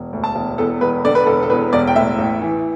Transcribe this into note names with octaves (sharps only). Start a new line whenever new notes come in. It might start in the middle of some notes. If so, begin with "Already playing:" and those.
Already playing: E1
D2
A5
E1
E2 A4
E1 B4
D3 D5
B4
E1 A4
A4
E2 B4
E1 D5
G5
A2 E5
A1
E3